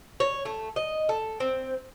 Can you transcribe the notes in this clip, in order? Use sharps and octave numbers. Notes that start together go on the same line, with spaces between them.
C#5
A3
D#5
A4
C4